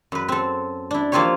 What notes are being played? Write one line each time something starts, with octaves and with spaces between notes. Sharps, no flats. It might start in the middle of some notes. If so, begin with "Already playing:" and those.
F#2 B4
C4 A4
D4 E4
F3 A#3 C4 F4 G4 C#5